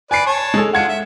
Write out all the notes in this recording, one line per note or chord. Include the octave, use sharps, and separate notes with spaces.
B4 D5 G#5 C7
C#5 A5
G#3 A4
D4 F4 F#5 G#6 C#7
E5